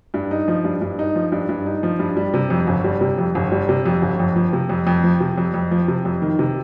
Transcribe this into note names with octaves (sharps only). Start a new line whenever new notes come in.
G2
D#4
F3
G2
G2
D#4
F3
G2
G2
D#4
F3
G2
G3
C3
F2
G1
G3
C3
F2
G1
G3
C3
F2
G1
F2
F3
C3
F2
F2
F3
C3
F2
F2
F3
C3
F2
D#3
C3